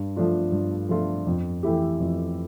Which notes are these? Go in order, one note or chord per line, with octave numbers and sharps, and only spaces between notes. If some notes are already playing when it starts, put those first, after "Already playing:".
Already playing: G2
F3 A3 D4 F4
G2
F3 A3 D4 F4
F2
E3 A3 E4 G4
F2